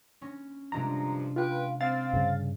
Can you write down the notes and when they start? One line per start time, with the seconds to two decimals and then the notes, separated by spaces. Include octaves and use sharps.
0.21 C#4 C#6 A#6
0.72 G2 C3 F3 G#3 D4 A#5
1.36 F4 B4 G5
1.81 C4 F5 A6
2.13 G2 C#3